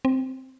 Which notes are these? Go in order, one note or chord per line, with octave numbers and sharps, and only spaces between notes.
C4